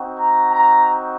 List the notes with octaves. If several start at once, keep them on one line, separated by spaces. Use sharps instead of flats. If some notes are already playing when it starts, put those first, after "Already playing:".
Already playing: C4 D#4 F#4
A#5
A#5